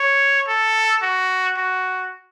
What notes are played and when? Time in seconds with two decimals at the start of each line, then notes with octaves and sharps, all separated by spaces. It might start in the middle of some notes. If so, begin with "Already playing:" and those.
Already playing: C#5
0.48 A4
1.03 F#4
1.57 F#4